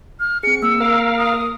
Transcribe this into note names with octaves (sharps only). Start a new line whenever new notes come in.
F6
C4 G#4 C#7
A#3 E6
A#4 F5
D#6